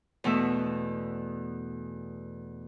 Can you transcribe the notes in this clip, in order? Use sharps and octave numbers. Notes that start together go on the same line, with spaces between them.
E2 B2 A3 E5